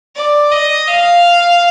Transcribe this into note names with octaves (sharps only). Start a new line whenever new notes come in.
D5
D#5
F5